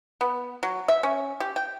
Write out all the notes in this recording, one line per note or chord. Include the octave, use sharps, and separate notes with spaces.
B3
F#3
E5
C#4
G4
G5